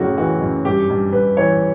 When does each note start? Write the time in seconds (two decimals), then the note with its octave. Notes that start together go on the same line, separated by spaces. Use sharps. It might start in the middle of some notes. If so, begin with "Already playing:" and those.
Already playing: F#2 A2 C#3 F#4 D5
0.17 E3 F#4
0.41 F#2
0.65 G2 G4
0.90 G2
1.13 G2 B4
1.37 E3 C#5